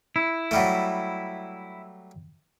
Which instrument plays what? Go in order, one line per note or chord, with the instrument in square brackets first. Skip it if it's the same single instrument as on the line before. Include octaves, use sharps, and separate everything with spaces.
[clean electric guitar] E4
[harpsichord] F#3 G3 A3